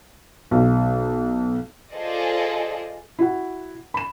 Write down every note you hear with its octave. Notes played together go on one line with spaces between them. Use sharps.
B1
F4 G#4 A4 C5 D5 D#5
E4 F#4 F#5
B5 E7